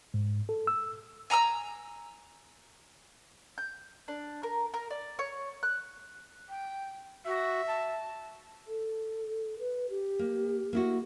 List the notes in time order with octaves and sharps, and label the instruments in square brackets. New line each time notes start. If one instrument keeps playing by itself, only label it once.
[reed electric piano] G#2
A4
E6
[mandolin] G#5 A#5 D#6 E6
G6
D4
A#4
A#4
D5
C#5
F#6
[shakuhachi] G5
[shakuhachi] F#4 [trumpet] E5
[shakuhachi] A5
[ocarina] A4
B4
G4
[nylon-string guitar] A#3
A#3 E4 F#4